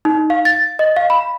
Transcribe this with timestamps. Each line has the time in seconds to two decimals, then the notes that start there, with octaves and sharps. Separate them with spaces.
0.05 D#4
0.30 F5
0.45 A6
0.79 D#5
0.97 F5
1.10 B5